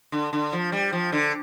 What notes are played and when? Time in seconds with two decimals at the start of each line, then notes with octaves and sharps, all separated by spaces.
0.12 D3
0.33 D3
0.53 F3
0.72 G3
0.93 F3
1.12 D3